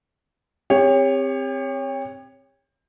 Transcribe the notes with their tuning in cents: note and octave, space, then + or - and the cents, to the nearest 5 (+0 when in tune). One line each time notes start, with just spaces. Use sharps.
C4 +0 G4 +35 C#5 +0